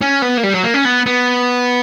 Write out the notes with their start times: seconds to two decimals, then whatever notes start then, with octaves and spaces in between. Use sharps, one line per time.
0.01 C#4
0.22 B3
0.37 A#3
0.43 G3
0.54 F#3
0.64 A#3
0.74 C#4
0.85 B3
1.06 B3